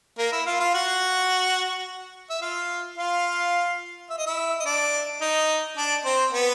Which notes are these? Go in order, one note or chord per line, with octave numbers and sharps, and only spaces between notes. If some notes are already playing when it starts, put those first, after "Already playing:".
A#3 A#4
E4 E5
F4 F5
F4 F5
F#4 F#5
E5
F4 F5
F4 F5
E5
D#5
E4 E5
D#5
D4 D5
D#4 D#5
D4 D5
C4 C5
B3 B4